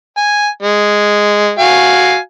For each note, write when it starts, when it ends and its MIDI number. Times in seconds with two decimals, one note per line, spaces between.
0.17 0.48 80
0.63 1.51 56
1.59 2.17 66
1.59 2.17 77
1.59 2.17 80